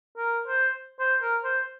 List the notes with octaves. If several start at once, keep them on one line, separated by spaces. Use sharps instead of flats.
A#4
C5
C5
A#4
C5